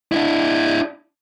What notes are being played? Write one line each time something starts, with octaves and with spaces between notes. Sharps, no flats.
D4 E4